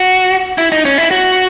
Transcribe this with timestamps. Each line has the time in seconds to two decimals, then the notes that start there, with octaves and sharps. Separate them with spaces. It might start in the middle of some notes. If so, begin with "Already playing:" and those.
Already playing: F#4
0.58 E4
0.72 D#4
0.85 C#4
0.98 E4
1.11 F#4